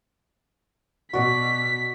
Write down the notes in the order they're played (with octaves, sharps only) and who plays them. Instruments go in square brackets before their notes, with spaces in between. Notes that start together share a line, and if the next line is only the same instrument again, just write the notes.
[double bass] B2 [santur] F#4 D5 D#5 [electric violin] B6